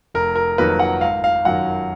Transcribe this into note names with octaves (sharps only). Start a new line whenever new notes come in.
F1 A#4
A#4
F2 D#3 F#3 A#3 B4
F#5
G#1 F5
F5
F#2 D#3 F#3 F#5